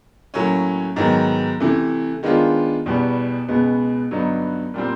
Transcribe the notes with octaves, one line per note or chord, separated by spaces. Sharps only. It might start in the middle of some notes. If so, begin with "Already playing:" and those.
A2 F#3 A#3 C#4
G#2 D#3 F#3 B3
C3 E3 A3
D#3 G#3 B3 D4 F4
E2 B2 G3 B3
C#2 B2 G#3 B3
G2 D3 F#3 B3 D#4
A#2 G3 C4